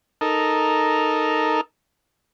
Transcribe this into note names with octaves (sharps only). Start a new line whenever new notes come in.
D#4 A4 A#4